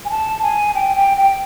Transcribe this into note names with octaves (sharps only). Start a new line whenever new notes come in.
G#5
A5
G#5
G5
G5
G5